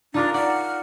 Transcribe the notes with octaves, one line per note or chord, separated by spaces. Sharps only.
D4 D#4 F4 A#4
D5 F#5 F6